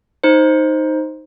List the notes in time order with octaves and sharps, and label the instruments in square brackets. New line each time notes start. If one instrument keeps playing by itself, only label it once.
[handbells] D#4 C5